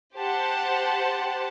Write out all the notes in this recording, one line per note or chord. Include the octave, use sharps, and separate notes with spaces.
G4 C5 F#5 A5